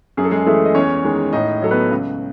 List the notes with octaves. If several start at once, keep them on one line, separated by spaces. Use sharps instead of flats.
F#2 G#4
A4
G#3 G#4
E3 G#3 A3 A4
D#5
E2 C#4 C#5
D#3 G#3
A2 D#4 D#5
F#3 A4
B3 B4
C#2